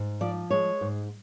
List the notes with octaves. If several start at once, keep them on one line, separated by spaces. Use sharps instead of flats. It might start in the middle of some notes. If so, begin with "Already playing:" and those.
Already playing: G#2
F3 D5
G#3 C#5
G#2